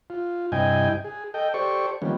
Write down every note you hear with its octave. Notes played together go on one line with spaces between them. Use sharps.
F4
G2 C3 E4 D#5 G5 G#5
G#4
A4 D#5 G5
G4 A4 C5 D5 C#6
D#3 F3 G3 A#3 B3 C#4